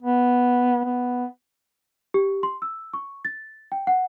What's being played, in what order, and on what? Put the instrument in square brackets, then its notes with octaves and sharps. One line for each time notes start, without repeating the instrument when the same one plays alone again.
[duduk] B3
B3
[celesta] G4
C6
E6
C#6
A6
G5
F#5